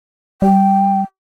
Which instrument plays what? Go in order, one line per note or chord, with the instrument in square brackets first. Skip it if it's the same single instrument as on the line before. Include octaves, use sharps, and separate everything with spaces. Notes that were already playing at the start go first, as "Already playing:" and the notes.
[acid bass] G3 [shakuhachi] G5